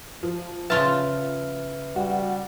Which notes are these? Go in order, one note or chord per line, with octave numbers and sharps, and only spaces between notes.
F3
C#3 F4 B4 E5 A5 F6
G3 F#4